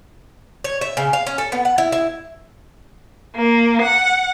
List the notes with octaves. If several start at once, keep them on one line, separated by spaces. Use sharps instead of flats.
C#5
E5
C#3
F5
C#4
A4
B3
F#5
E4
E4
A#3
F#5